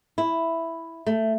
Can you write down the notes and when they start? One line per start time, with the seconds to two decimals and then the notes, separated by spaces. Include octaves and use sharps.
0.18 E4
1.07 A3